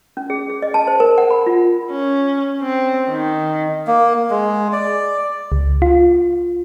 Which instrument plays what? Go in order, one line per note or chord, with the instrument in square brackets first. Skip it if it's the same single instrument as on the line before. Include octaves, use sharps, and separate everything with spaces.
[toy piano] C#4
G#4
G#4
D#5
A5
C5
A#4
F#5
B5
F4
[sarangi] C#4
C4
D#3
[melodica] A#3
G#3
D5
[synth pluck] C#2
F4